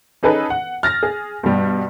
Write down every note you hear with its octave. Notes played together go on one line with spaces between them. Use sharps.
C#4 D#4 G#4 A4 B4
F#5
F6 A6 A#6
G#4
G2 B2 G3